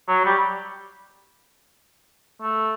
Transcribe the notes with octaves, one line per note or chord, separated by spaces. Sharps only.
F#3
G3
A3